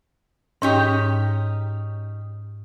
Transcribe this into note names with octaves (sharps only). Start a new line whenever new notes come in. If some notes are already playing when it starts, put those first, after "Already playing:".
G#2 C#4 D#4 G4 G6